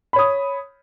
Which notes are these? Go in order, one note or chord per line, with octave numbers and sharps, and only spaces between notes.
C#5 B5 D#6